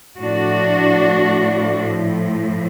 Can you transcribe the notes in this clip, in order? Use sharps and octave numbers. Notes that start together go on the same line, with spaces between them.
A2 F3 D4 F#4